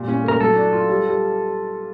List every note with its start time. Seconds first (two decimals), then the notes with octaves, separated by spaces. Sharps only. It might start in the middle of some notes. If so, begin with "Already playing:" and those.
Already playing: A#2 G3
0.08 C#4
0.24 A3 A#4
0.40 F#3 A4
0.56 D4
0.72 F4
0.88 G3
1.05 G3